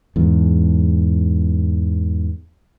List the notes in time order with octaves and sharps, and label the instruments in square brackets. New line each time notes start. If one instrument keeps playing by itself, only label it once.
[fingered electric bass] E2 G#2